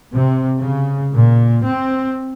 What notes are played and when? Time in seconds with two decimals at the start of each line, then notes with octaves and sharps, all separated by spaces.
0.14 C3
0.58 C#3
1.13 A#2
1.64 C4